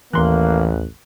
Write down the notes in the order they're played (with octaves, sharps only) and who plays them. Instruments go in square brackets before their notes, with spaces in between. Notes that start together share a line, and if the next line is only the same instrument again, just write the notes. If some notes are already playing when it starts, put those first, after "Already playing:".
[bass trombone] A1 [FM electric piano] D#2 F#6 [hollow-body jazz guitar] E3 C6 [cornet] A#3